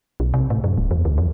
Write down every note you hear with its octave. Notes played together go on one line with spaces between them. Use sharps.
B1
C3
A2
F#2
D1
E2
D2
F2